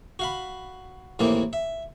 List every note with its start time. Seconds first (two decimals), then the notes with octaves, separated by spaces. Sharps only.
0.19 F#4 F5 B5
1.19 D#2 A2 E3 A#3 C4
1.53 E5